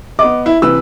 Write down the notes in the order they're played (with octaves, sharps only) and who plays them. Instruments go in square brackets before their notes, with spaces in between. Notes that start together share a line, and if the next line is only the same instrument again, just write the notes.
[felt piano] B3 D#5 [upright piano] D6
[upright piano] E4
[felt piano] C3 E3 B4 [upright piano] E6